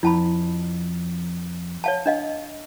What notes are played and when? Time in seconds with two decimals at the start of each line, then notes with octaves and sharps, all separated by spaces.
0.03 F2 E4 A5 B5
1.84 C#5 F5 A5
2.06 D4 D#5 F5